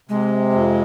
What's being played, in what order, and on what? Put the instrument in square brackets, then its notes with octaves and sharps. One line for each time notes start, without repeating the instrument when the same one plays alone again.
[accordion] C3 [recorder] G#3
[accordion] F2